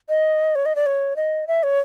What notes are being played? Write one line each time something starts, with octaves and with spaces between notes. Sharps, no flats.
D#5
C#5
D#5
D5
C#5
D#5
E5
C#5